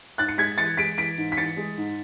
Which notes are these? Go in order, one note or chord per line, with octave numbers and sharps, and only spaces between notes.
G#2 F#6 A6
C#7
G#3 G#6 B6
E3 A6 C#7
G#3 B6 D7
E3 B6 D7
G#2
B6
E3 A6 C#7
G#3
G#2